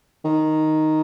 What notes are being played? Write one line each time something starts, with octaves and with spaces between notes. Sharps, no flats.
D#3